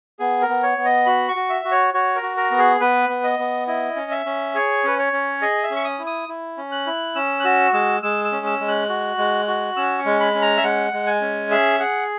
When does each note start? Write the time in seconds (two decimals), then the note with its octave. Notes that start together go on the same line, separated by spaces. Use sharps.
0.19 B3 G#4
0.42 A#4
0.49 B3
0.63 C#5
0.78 B3
0.85 D#5
1.06 F#4 B5
1.28 C#6
1.36 F#4
1.49 E5
1.65 F#4
1.72 C#5
1.94 F#4 C#5
2.15 A#4
2.22 F#4
2.37 A#4
2.51 B3
2.58 G#4
2.81 B3 B4
3.09 B3
3.24 D#5
3.39 B3
3.67 E4 D#5
3.96 C#4
4.11 E5
4.26 C#4
4.55 G#4 C#5
4.84 C#4 B4
4.99 C#5
5.13 C#4
5.42 G#4 D#5
5.63 E5
5.71 C#4
5.76 C#6
5.85 D#6
5.99 E4
6.07 D#6
6.29 E4
6.58 C#4
6.72 F#6
6.87 E4
7.15 C#4 E6
7.40 F#6
7.45 F#4 E6
7.73 G#3 E6
8.03 G#3 E6
8.25 E6
8.32 C#4
8.46 E6
8.60 G#3
8.68 F#6
8.89 F#4
9.18 G#3
9.48 F#4
9.76 C#4 E6
9.99 C#6
10.06 G#3
10.20 B5
10.35 C#4
10.42 A#5
10.57 E5
10.63 G#3 F#5
10.93 G#3
11.07 G#5
11.21 C#4
11.51 G#4 E5
11.80 G#4 F#5